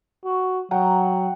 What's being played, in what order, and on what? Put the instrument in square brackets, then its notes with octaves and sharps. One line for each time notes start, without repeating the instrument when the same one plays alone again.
[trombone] F#4
[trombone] F#3 [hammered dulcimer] F#5 G5 A#5